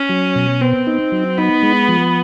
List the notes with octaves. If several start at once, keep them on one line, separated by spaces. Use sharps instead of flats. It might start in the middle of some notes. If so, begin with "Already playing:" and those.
Already playing: C#4
F#3
B2
B3 C4
D#4
F#3
B3 D#4
G#3
F3